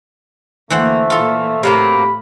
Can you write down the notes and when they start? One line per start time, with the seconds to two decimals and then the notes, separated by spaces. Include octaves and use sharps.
0.70 D2 E3 A3 A#3 C5 F#5
1.10 A#2 E3 F4 A4
1.63 A2 C3 F#3 A#3 F5 B5